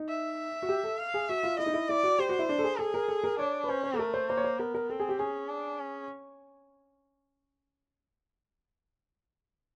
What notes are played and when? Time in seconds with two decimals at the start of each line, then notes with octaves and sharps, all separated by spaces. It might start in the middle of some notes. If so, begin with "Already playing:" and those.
Already playing: D#4
0.09 E5
0.62 F#4
0.69 G4
0.84 A4
0.98 F5
1.14 G#4
1.29 F#4 E5
1.43 F4
1.59 E4 D#5
1.66 D#4
1.74 E4
1.89 E4 D5
2.03 F#4
2.19 G4 C5
2.29 F#4
2.39 E4
2.49 D4
2.59 A4
2.64 G#4
2.79 G#4 A4
2.94 A#4
3.08 A4
3.24 A#4
3.39 D4 C#5
3.64 B4
3.69 C#4 C5
3.83 C5
3.94 A4
3.99 A3 A#4
4.14 C5
4.29 A#3 C5
4.37 C#5
4.44 C5
4.59 B3 A#4
4.75 A#4
4.90 C4 A4
5.00 G#4
5.09 G4
5.19 C#4 G#4
5.49 D4
5.79 C#4